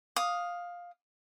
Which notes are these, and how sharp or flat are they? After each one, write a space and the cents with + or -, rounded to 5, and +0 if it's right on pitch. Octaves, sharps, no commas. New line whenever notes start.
F5 +10 D#6 +0